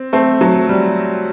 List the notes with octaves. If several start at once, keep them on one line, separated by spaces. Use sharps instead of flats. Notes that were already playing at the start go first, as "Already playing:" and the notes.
Already playing: C4
A3 C4
F#3 A3
G3